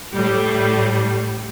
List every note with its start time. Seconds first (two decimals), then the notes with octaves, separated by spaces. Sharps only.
0.13 A2 G3